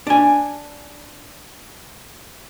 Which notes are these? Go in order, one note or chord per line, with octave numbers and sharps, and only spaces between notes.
D4 G#5